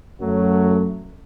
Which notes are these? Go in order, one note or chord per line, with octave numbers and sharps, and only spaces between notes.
F#2 F#3 A3